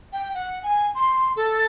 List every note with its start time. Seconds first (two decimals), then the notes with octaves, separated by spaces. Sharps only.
0.13 G5
0.34 F#5
0.63 G#5
0.95 C6
1.36 A4